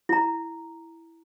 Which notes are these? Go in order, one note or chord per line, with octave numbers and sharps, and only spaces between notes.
E4 A#5